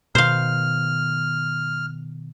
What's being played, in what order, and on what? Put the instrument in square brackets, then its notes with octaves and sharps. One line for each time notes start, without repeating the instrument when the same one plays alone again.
[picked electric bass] B2 D#3 [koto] C5 F5 [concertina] F6